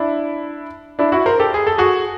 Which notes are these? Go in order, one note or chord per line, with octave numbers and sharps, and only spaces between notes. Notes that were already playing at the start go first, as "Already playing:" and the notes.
Already playing: D4 E4
D4 E4
E4 F#4
A#4 C5
G4 A4
G#4
A4
F#4 G#4